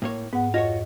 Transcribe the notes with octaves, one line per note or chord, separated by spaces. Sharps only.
A2 A#3 C#5
G#2 B3 F#5
F2 F4 F#4 C#5 D#5 A#6